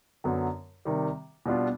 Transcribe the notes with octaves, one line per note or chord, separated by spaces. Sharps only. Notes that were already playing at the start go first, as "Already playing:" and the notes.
F#2 D3 F#3 B3
C3 D#3 G3
B2 G3 B3 D4 F4